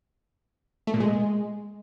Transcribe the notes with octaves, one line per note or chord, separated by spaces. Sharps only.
A3
A#2
G#3